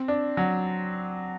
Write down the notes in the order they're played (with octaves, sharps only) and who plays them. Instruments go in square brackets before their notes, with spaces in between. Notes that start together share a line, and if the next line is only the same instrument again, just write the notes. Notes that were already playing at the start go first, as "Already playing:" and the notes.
Already playing: [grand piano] C4
D4
F#3